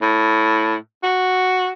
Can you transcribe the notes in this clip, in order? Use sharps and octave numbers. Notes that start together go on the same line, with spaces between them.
A2
F#4